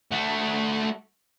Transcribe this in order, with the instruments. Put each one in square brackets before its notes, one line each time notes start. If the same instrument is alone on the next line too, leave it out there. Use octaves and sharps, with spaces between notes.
[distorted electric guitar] A3 F#4